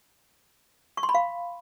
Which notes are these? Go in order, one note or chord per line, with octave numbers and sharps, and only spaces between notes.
C#6
C6
B5
F5